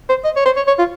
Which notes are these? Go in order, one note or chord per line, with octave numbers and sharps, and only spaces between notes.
C5
D#5
C#5
C5
C#5
C#5
F4